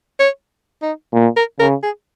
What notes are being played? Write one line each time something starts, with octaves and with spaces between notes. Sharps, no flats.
C#5
D#4
A#2
A#4
C#3 A#4
G#4